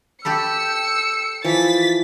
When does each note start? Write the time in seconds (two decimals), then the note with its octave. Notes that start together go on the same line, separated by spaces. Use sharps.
0.25 G4 A4 B5 E6 C#7
1.44 E3 F3 A6 B6